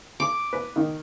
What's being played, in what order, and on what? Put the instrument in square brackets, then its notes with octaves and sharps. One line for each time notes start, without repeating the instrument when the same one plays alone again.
[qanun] D6
[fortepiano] B4
D#3